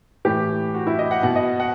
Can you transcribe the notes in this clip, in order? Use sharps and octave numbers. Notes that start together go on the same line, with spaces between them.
A2 E3 G4
F#4
E4
D#5
F#5
B2 F#5
D#5
F#5